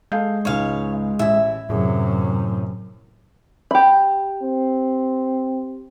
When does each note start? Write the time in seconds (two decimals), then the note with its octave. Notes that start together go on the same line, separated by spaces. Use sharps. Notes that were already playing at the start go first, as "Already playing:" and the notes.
0.12 G#3 A4 F5 G6
0.45 C#2 G#2 C#5 F5
1.19 A1 E4 E5
1.70 F#2 A2 C3 G#4
3.71 G4 B5
4.42 C4